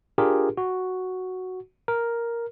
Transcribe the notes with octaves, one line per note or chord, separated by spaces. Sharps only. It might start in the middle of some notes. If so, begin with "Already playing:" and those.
D4 F4 G4 G#4 A#4
F#4
A#4